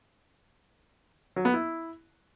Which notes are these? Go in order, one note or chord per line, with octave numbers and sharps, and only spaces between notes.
F#3
B3
E4